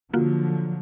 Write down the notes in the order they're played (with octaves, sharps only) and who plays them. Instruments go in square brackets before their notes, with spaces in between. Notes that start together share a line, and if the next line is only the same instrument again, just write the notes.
[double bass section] D3 F3 F#3 [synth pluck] A#3 F4 F#4